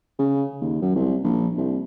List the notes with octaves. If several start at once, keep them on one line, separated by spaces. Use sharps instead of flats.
C#3
D#2
F#2
C2
A#1
C2